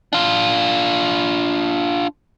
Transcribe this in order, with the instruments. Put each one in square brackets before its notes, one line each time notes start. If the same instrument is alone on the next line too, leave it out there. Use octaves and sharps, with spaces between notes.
[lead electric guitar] D4 F4